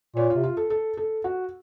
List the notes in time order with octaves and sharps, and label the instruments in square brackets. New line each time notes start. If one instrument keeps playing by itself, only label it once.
[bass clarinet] A#2 [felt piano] C#5
[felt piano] F4
[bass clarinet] C3
[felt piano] F4
A4
A4
A4
F#4